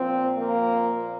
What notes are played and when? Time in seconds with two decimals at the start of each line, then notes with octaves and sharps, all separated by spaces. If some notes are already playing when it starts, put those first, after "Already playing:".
Already playing: A#2 F3 C4
0.37 A#3